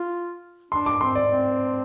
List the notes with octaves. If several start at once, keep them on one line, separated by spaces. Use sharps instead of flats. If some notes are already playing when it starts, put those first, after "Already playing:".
Already playing: F4
D4 C6
D6
C4 C6
D5
C4